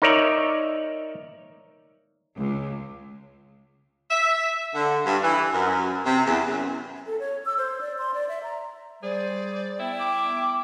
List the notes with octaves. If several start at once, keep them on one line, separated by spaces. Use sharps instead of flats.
D#4 A#4 C#5 D5 E5
C#2
E5
D3
G2
E3
F#2
C3
E2
F#2
A4
C#5
E6
C5
D5
C6
D5
E5
A#5
G3 G#4 C5 D5
B3 E4 G5
D6